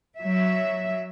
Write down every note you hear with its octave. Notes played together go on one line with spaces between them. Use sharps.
F#3 E5